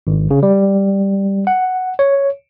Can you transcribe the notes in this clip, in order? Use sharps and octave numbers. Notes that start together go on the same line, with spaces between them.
G#1
C#3
G3
F#5
C#5